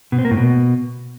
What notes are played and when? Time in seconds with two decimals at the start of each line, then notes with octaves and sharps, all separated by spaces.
0.12 B2
0.19 C4
0.25 A#3
0.31 A2
0.37 B2